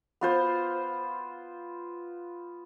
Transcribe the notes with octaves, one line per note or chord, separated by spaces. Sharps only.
B3 F4 C5